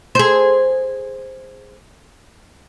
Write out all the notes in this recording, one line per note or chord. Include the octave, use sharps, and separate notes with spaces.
G#4 C5